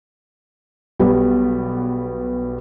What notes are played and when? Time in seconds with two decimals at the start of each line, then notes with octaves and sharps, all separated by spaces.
0.99 B1 G3 B3